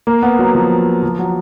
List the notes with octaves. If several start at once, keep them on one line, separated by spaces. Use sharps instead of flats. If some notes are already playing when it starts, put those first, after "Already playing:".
A#3
B3
F#3
F3
F3
F#3